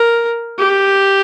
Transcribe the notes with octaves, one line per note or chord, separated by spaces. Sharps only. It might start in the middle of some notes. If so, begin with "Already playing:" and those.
Already playing: A#4
G4